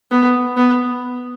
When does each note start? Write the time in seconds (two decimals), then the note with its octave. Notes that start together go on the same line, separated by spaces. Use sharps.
0.11 B3
0.57 B3